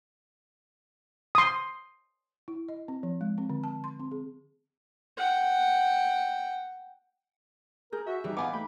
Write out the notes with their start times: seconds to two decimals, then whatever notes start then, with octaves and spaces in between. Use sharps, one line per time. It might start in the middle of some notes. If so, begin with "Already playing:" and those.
1.35 C6 D#6
2.48 E4
2.69 D#5
2.88 C4
3.03 F3
3.21 G#3
3.38 C4
3.50 D3
3.64 A5
3.84 C6
4.00 C4
4.11 G#4
5.17 F#5 G5
7.93 G#4 A#4 G6
8.06 F#4 E5
8.24 E3 G3 D#4 G#4
8.37 B3 F5 G#5 D6
8.53 A3 G5 B5